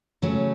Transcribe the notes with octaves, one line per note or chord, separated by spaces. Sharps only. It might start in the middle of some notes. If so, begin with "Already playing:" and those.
C#3 F#3 A3 C#4